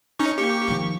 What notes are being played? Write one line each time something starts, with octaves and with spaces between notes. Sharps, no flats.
C#4 D#4 C#6
A#3 G4 C#6
D#3 F3